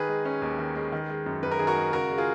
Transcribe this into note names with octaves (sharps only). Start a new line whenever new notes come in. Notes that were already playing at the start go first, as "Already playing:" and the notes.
Already playing: D#3 G#4 B4
G#3
C#4
D#2
D#3
G#3
D#3
G#3
F#2
F#2 B4
A#4
D#3 G#4
F#4 A#4
G#3
C#3 F#4 A#4
G#3
F4 G#4